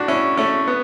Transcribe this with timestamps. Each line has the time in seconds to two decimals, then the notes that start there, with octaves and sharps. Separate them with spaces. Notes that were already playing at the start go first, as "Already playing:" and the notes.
Already playing: A2 D4 F#4
0.08 C#4 E4
0.37 A3 C#4
0.68 B3